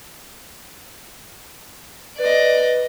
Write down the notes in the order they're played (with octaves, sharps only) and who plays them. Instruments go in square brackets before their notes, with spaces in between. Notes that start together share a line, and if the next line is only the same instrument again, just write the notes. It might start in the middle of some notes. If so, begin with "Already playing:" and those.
[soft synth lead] B4 [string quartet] D5 D#5